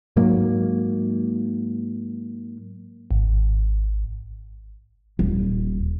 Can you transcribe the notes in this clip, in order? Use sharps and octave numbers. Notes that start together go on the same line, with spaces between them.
G#2 F#3 A#3
G#1
D#1